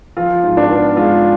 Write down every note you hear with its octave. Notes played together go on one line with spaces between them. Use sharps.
F3 F4
G#2
D4
B3
G#3 F4